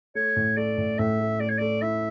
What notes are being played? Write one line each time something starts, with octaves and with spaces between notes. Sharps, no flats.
A3 C#5
A2
A3 D5
A2
A2 E5
A3
A3 D5
C#5
A3 D5
E4 E5